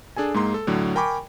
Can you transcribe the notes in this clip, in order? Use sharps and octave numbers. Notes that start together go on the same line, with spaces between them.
D4 G#4 A4 G#5
G#2 G#3 A#3 A#5 C6
A4
A2 D3 F#3
A#4 G5 G#5 B5 C#6 D6